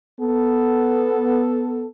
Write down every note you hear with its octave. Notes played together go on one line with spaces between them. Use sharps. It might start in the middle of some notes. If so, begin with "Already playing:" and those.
B3 A4